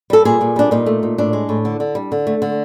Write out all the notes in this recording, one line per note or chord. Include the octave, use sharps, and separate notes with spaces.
G3 A4
A#2 G#4
A#2
G3 D4
A#2 D#4
A3
A#2
A2 D4
G#3
A2
D3
D3
G3
D3
A3
D3